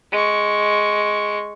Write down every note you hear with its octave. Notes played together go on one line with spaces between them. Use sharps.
G#3 C#6